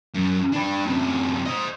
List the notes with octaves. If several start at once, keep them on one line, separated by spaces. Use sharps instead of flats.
F#2
D4 B4
F#2 C3
C5 D#5